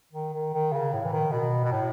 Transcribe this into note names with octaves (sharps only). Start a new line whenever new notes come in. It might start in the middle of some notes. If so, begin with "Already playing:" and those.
D#3
D#3
D#3
C#3
A2
E3
D#3
B2
B2
A2